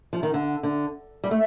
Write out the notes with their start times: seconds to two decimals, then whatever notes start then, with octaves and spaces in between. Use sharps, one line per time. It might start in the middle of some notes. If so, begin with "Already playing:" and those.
0.13 F3
0.23 D#3
0.34 D3
0.63 D3
1.24 G3
1.31 A3